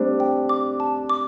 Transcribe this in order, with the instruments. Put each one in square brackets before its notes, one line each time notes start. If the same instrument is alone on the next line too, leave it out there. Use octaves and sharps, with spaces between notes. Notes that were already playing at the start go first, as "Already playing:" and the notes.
Already playing: [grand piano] G3 A3 C4 D4 [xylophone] C5
[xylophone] G5
D6
A5
D6